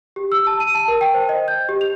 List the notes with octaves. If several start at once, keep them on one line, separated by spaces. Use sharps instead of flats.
G4
E6
A5
D#7
A5
A#4
G5
C5
D#5
G6
G4
F7